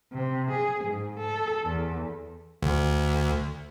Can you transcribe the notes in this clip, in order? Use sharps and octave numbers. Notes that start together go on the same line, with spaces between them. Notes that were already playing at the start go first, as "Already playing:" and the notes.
C3
G#4
G#2
A4
E2
D2